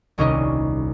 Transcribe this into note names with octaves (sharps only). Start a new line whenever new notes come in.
D#1 C2 C#4 D#4 A#4 D#5